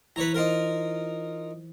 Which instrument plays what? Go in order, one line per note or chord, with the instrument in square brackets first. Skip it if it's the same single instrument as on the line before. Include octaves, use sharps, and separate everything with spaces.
[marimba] E3 E4 [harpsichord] B4 C#5 A#5
[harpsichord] D#4 F4 A#4 [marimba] C5